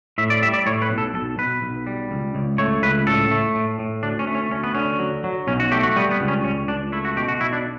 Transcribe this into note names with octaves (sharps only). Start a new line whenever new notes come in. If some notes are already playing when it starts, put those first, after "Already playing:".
A2 E5
D5
G3 E5
D5
A2 C#5
B4
B1
A4
B1 A4
B2 B4
B1
G3
C#2
C#2
A3 C#5
C#2 B4
A2 A4
A3
A2
A2
D2 D4
C#4
A3
C#4
D2 C#4
B3
D3 C#4
F#3
F#3
B1 C#4
F#4
A3 G4
F#4
G3 B3
B3
C#2
C#4
C#2 C#4
C#2 D4
A3 E4
F#4
B2 G4
F#4
B1 E4
D4